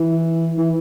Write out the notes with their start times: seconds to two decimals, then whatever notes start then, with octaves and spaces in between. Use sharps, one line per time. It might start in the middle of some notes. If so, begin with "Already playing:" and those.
Already playing: E3
0.58 E3